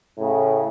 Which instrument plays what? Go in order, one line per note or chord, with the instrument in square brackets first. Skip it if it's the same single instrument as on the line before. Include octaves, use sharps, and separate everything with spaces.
[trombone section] A2 C#3